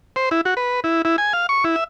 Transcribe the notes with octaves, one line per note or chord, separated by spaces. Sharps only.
C5
E4
F#4
B4
E4
E4
G#5
F5
C#6
E4
E5